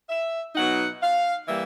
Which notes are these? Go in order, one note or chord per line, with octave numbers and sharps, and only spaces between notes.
E5
B2 F#3 B3 D#4 F#5
F5
E3 G3 A#3 E5